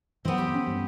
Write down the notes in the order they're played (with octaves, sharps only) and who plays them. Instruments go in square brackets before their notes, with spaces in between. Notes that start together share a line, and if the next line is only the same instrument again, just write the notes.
[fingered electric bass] F#2 E3 F#3 [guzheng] B3 C4
[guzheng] G4
[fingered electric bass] C#4
G2